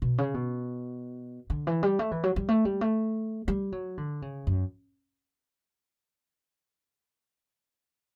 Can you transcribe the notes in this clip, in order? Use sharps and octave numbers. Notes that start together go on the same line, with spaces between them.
B2
C#3
B2
D3
E3
G3
A3
E3
F#3
G3
A3
G3
A3
G3
F#3
D3
C#3
F#2